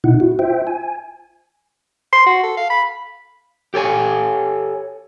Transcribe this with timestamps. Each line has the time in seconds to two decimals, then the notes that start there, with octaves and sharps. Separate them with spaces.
0.04 B2 D#4 E4 F#5
0.20 E4 F#4
0.39 F4 C5 E5 G5
0.67 G#5
2.13 C6
2.26 F#4
2.43 A4
2.57 F5
2.70 B5
3.74 G4 A4 C#5 G#5